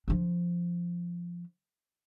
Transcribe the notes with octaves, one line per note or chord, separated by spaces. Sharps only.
F3 D4